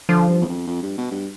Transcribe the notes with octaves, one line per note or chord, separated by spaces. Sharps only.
D3 F3
G2
E2
F2
F2
G2
B2
G2